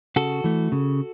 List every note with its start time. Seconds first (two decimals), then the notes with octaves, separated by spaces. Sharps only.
0.16 C#3 F#4 A4
0.44 E3 A3
0.72 C#3